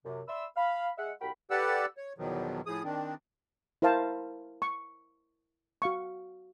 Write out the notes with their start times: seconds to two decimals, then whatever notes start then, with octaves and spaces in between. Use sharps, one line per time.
0.05 F#2 C3
0.28 D5 E5 B5 C6 E6
0.57 F5 B5
0.98 G#3 E5 F#5
1.20 C2 F#4 A#4 G5 B5
1.51 G4 A4 B4 D5 F#5 E6
1.97 C#5
2.18 E2 B2 D#3 F3 F#3
2.66 A2 F3 G#4 D#6
2.84 D#3 C4 D4
3.82 E4 A#4 C5 F5 A5
4.62 C#6
5.82 F#4 F5 C#6